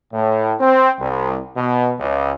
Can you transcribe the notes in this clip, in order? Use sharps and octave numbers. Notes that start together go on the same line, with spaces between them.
A2
C4
C2
B2
C#2